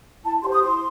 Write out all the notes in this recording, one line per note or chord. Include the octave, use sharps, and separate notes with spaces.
E4 A5
G4 C5 C6
D#6
E4 C6